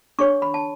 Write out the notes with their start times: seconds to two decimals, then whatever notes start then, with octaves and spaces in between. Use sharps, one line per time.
0.19 D4 G#4 C#5 C#6
0.42 B5
0.54 A5